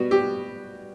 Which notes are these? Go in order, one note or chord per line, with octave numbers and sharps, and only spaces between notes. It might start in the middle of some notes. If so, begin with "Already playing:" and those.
Already playing: B2 G3 B3 F#4
G4